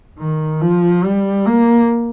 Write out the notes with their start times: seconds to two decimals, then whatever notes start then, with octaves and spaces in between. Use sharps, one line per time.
0.19 D#3
0.61 F3
1.04 G3
1.47 A#3